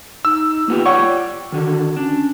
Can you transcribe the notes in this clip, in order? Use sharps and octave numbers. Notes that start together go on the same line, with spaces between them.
D#4 E6
A#3 B3 F4 G4
C#5 D5 F#5 G5 C#6
D3 D#3 F#4
C#4 D4